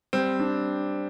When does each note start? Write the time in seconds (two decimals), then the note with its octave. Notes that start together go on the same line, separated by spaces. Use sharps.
0.13 G3 C4
0.40 D4